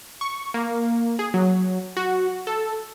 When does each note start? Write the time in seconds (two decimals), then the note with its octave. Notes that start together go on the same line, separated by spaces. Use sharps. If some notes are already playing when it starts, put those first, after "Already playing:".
0.21 C#6
0.54 A#3
1.19 G#4
1.34 F#3
1.97 F#4
2.47 A4